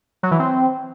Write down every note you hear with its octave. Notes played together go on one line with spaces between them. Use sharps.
F#3
E3
C4